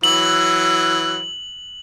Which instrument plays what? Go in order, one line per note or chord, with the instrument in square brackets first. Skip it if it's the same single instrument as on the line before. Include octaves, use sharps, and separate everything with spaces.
[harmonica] E3 F#3 [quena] E6 [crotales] F#7